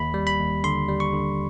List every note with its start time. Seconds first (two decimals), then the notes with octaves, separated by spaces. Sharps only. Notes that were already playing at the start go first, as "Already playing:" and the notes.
Already playing: D#2 B5
0.14 G3
0.27 B5
0.39 D#2
0.64 D3 C6
0.88 G3
1.00 C#6
1.13 D3